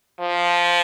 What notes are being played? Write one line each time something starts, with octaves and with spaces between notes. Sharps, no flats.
F3